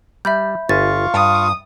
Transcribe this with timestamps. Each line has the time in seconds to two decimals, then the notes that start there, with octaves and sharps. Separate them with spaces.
0.25 G3 E5 B5 G6
0.69 G1 F4 E5 F5 G#5 C#6 A6
1.14 G2 D#6